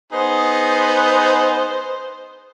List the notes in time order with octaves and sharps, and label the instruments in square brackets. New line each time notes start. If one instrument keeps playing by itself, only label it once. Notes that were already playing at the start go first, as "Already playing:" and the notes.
[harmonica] B3 D#4 G#4 [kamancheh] C5